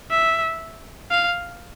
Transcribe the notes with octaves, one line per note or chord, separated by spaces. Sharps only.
E5
F5